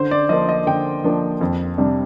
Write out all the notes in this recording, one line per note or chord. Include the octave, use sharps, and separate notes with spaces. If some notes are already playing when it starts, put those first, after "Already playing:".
Already playing: D3 C5
D5
F3 A#3 D4 D#5
D#5
D3 G5
F3 A#3 D4
F2
C3 G3 D4